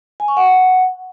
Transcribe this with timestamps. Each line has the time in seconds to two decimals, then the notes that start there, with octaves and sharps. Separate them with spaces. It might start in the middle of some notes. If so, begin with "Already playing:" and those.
0.20 G#5
0.28 C#6
0.37 F#5